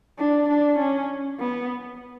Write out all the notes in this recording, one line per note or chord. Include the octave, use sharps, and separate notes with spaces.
D4
D4
C#4
B3